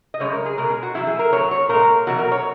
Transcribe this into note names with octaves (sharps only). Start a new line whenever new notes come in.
D#5
F#2 C#3 G#3 C#5
A#4
G#4
B2 G#3 A#4
G#4
F#4
E2 C#3 F#3 E4
G#4
A#4
A#2 F#3 C#5
C#5
A#2 G#3 A#4
E2 B2 F#3 F#4
A#4
C#5